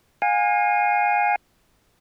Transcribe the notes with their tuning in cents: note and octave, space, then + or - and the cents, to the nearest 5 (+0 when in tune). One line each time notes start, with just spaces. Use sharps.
F5 +35 G#5 -20